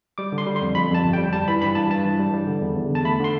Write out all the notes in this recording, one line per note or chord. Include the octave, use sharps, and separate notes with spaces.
G3 D6
D3
C6
G3
C6
F2
F2 B5
F2 A5
G1
G5
G3
G3 A5
E3 B5
G2 B5
G2 A5
G2 A5
E3
G3
G3
D3
E2
E2
D3
A5
A3 B5
D3 C6